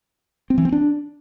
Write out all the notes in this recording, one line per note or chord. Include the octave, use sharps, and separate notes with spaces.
C4
E3
C4
D4